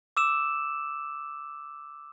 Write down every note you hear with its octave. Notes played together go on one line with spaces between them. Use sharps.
D6 E6 E7